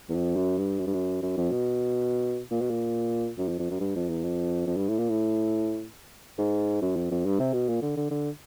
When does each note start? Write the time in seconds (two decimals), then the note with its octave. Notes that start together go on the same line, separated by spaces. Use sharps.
0.09 E2
0.14 F2
0.36 F#2
0.58 G2
0.79 F#2
0.87 G2
0.94 F#2
1.22 F#2
1.37 F2
1.51 B2
2.51 A#2
2.61 B2
2.70 A#2
3.38 F#2
3.48 F2
3.59 F2
3.71 F#2
3.80 G2
3.96 F2
4.09 E2
4.24 F2
4.67 F2
4.77 G2
4.89 A2
4.99 A#2
5.10 A2
6.38 G#2
6.82 F#2
6.96 F2
7.11 F2
7.26 G2
7.39 C3
7.53 B2
7.69 A#2
7.82 D3
7.97 D3
8.11 D3